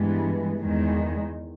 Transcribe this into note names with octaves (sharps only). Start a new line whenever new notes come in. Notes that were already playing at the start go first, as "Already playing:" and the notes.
Already playing: G2 E3 G#3 B3
E2 D#3 G#3